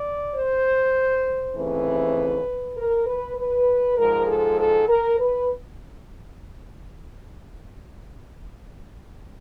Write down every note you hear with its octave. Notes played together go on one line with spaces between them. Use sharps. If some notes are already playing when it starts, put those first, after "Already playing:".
Already playing: D5
C5
D#2 C#3 E3 A3 C4 B4
A#4
B4
B4
G#2 F3 G#3 A#4
A4
A4
A#4
B4